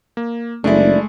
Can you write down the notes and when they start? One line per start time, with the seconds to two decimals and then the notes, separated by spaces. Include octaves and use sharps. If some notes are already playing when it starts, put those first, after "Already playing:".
0.17 A#3
0.64 F#1 G#3 A3 D4 E4